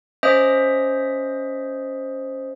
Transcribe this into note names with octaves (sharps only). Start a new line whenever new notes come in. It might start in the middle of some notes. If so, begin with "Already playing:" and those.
C#4 C5 D#5 E5 D#6